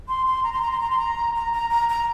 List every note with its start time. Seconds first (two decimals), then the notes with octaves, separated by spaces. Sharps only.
0.08 C6
0.27 C6
0.44 A#5
0.53 C6
0.62 A#5
0.72 C6
0.80 A#5
0.91 C6
0.99 A#5
1.35 A#5
1.53 A#5
1.70 A#5
1.89 A#5